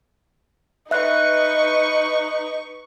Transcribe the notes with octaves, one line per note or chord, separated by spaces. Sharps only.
D#4 B4 E5 C#6 F#6